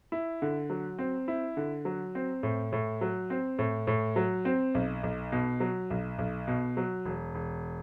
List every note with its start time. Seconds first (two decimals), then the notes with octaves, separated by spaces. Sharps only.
0.12 E4
0.42 D3
0.70 F#3
0.99 C4
1.28 E4
1.57 D3
1.85 F#3
2.15 C4
2.43 A2
2.72 A2
3.01 F#3
3.30 C4
3.59 A2
3.87 A2
4.16 F#3
4.45 C4
4.74 B1
5.03 B1
5.32 B2
5.60 F#3
5.90 B1
6.18 B1
6.48 B2
6.77 F#3
7.05 E1
7.35 E1